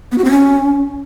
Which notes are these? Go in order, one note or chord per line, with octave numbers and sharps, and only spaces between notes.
B3
F#4
C4
C#4